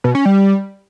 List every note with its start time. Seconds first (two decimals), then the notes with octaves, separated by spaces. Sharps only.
0.04 B2
0.15 C#4
0.25 G3